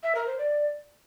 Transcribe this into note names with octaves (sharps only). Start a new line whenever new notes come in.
E5
A#4
C5
D5